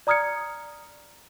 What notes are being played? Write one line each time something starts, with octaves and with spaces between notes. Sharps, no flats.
D5 A#5 D#6 F6 G#6 C#7